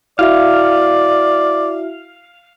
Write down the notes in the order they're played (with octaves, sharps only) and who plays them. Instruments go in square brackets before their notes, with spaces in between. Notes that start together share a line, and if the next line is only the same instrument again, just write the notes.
[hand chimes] E4 F#4 E5 [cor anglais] D5 [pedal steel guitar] F5